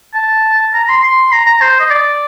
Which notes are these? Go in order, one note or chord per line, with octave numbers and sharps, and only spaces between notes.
A5
A#5
C6
C6
A#5
A#5
C5
D#5
D5